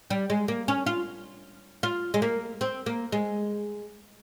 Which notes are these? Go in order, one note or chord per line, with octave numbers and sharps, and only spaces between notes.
G3
G#3
A#3
C#4
F4
F4
G#3
A#3
C4
A#3
G#3